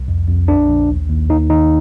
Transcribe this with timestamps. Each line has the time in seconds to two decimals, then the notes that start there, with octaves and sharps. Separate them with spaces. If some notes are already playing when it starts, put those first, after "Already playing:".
Already playing: C2
0.08 F2
0.28 F2
0.48 A#1 D4
0.69 A#1
0.89 D#2
1.09 D#2
1.29 D#2 D#4
1.50 D#3 D#4